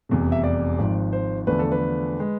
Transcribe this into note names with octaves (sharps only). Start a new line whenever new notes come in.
F1 E2 C3
E5
D5
G#1 G#2 F3
C5
E2 D3 F3 A3 D4 B4
A4
B4
G#3